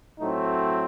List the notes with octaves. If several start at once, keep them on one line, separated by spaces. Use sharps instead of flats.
A2 F#3 A3 C4 D#4